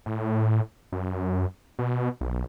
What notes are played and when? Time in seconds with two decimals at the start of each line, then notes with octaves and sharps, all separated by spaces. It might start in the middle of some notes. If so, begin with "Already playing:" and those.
0.06 A2
0.92 F#2
1.79 B2
2.21 B1